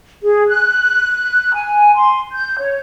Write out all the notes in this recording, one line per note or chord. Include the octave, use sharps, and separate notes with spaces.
G#4
F#6
G#5
C6
G6
C#5